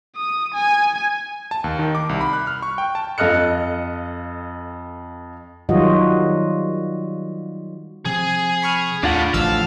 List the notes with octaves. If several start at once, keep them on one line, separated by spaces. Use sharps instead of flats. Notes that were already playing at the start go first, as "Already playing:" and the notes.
D#6
G#5
A5
D#2
D#3
D6
C2
B5
F#6
F6
C#6
G5
A5
F2 A4 D#5 F6 F#6 C#7
D#3 F#3 G3 F4 F#4 D#5
C3 F3 C4 G#4
B5 C#6 F6
D#2 A2 D4 F4 F#5
A1 D3 F3 A3 F5 A5 E6